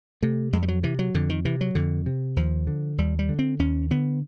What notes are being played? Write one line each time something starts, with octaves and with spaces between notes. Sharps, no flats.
C3 A3
F2 G#3
G3
F#3
C3 E3
F#3
F2 D3
D#3
C3 E3
F#3
F2 D3
C3
D#2 F3
D3
D#2 G3
G3
D3
C4
D#2 C#4
D3 B3